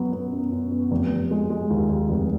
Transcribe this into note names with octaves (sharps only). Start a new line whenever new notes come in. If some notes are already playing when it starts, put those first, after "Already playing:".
Already playing: F#2 F#3 B3
B3
F#2
F#2
B3
F1
F1
G#3
G#3
D#2
D#2
F1